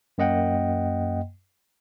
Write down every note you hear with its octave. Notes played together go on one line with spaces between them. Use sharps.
F#2 A#3 D#5 F#5 G5